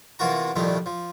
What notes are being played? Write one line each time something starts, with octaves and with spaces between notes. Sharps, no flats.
E2 C3 A#3 F4 F#4 A#5
C2 A#2 D#3 F3 G3 A3
F3